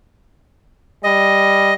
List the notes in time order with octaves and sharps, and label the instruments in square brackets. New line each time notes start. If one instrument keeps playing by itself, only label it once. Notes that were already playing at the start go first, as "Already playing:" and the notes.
[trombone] G3 [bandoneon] D#5